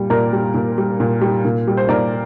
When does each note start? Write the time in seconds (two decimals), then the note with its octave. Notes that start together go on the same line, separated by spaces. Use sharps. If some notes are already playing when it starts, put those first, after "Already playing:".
Already playing: A#2 G3
0.10 A#2 A#4 D5
0.33 G3
0.54 A#2
0.78 G3
1.00 A#2
1.21 G3
1.45 A#2
1.67 G3
1.77 C5
1.89 A#2 A#4 D5